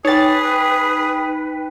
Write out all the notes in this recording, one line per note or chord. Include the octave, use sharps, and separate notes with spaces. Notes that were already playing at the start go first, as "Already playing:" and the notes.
D#4 G#4 B4 C#5 G5 A6